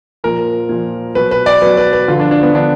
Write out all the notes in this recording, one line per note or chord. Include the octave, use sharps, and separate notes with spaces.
A#2 F3 A#4
A#2 F3
B2 F#3 B4
B4
D5
B2 F#3 B4
B4
B4
D3 F4
F3
D4
D4
B3
D3 F3 D4